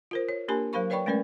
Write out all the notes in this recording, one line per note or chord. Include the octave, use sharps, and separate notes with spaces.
F4 A#4 C5
C#5
A#3 D4 G4 A#4 G#5 B5
F#3 A#4 C5 F5 B5 C#6
B4 C#5 D5 G5 B5 C#6
G#3 A3 C#4 A#4 B4 D5